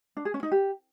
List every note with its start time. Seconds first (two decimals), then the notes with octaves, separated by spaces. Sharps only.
0.17 D4
0.25 G#4
0.34 C#4
0.43 D#4
0.52 G4